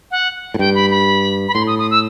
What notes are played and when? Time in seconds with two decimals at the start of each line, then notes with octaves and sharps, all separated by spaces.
0.11 F#5
0.54 A2
0.59 G2 G5
0.75 B5
0.91 B5
1.48 B5
1.54 A2 C6
1.67 D#6
1.79 D#6
1.91 E6